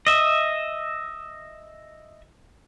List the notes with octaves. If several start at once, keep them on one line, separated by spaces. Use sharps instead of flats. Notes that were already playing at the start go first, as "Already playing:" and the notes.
D#5 E5